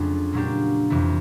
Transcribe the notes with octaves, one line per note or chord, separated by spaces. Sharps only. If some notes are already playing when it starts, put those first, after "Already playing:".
Already playing: F2 C#3 F#3 A3 D4
A#2 F#3 A#3 D4 G4
F2 C3 E3